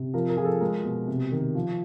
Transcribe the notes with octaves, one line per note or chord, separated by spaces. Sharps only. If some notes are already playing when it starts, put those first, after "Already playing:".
Already playing: C3
F3 A#4
A#4
F3 G#4
A4
G#3 A#4
B2
C3
D#3
F3